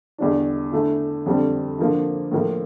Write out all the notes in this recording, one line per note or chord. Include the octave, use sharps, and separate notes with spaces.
E2 D3 G3 D4
D3 A3 E4
F2 D3 G3 C4
D3 F3 A#3
A2 F3 A#3